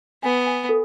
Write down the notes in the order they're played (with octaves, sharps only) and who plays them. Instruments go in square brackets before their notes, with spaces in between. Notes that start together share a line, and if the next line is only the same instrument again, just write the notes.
[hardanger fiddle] B3 [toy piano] G#5
[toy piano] G#5
A4